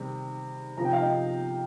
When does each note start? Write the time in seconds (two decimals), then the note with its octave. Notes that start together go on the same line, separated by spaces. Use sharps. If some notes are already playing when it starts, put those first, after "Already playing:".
Already playing: C3 D#3 G3
0.77 C3 F3 A#5
0.85 G5
0.93 F5
1.01 D#5 G5